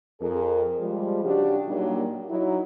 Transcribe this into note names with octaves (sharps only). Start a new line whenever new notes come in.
F2 G#4 A#4
F3 G3 G#3
C#3 D4 F#4 G4
A#2 F#3 G3 A#3 D4 D#4
F#3 D#4 E4